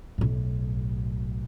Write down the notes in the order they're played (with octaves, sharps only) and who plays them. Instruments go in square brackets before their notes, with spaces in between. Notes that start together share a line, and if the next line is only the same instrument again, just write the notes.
[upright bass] B1 A2